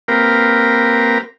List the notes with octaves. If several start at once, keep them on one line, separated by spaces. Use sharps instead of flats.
A#3 C4 G4 A#4 B4 F5